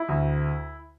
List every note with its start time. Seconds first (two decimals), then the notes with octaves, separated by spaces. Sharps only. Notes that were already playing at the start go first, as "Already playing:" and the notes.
Already playing: E4
0.08 D2